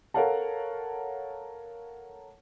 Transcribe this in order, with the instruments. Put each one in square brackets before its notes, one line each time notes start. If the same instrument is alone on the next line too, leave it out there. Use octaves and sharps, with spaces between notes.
[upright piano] A4 A#4 C#5 F5 F#5 A5